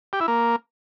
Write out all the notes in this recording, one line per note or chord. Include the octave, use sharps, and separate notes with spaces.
G4
E4
A#3